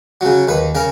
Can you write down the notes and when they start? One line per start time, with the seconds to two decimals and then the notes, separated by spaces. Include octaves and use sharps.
0.21 C#3 F#3
0.48 D#2 B4
0.75 C#3 A#4